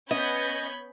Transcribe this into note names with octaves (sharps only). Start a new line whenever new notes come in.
B3 C#4 D#5 B5 G6 G#6